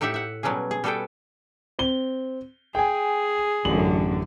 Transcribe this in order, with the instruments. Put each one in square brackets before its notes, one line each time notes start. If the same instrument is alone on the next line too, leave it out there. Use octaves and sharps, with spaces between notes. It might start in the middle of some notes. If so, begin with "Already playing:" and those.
[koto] A2 D#4 G4 E5 F#5
E5 F#5
B2 F#3 G3 C#4 G#4
G#4
G3 F#4 G#4 A4 B4 G5
[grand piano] C4 G7
[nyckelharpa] G#4 [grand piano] G5 G#5
[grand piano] A1 F#7 [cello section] F#2 D3